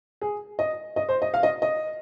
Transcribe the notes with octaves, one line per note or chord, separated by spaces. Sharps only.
G#4
D#5
D#5
C5
D#5
F5
D#5
D#5